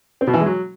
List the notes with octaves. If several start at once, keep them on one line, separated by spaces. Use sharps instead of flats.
C4
B2
E3
G#3
F#3